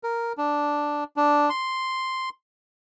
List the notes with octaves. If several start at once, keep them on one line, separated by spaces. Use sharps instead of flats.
A#4
D4
D4
C6